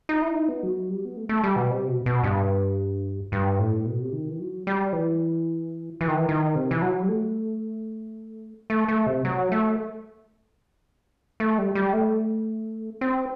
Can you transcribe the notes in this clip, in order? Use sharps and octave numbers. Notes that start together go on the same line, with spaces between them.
D#4
E4
D#4
B3
F#3
G3
B3
A3
A3
G3
B2
C3
B2
B2
G2
G2
A2
B2
C3
D#3
E3
F#3
G3
E3
E3
D#3
E3
D#3
C3
E3
F#3
G3
A3
A3
A3
C3
F#3
A3
A3
G3
G3
A3
C4